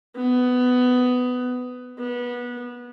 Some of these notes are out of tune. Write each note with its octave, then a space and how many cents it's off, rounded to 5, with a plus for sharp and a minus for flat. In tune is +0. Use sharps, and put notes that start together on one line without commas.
B3 +15
B3 -20